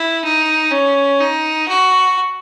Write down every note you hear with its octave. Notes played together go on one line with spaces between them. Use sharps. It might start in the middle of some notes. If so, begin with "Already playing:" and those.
Already playing: E4
D#4
C#4
D#4
F#4